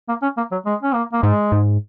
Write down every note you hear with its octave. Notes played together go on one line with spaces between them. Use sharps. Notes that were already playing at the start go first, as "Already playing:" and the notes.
A#3
C#4
A#3
F#3
G#3
C#4
A#3
A#3
G#2 G#3
G#2